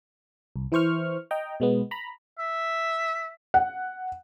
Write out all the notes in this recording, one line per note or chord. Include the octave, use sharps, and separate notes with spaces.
C2
E3 E4 C5 C#6 F6
D#5 G5 A#5
B2 G#3 B3
A#5 B5
E5
F#5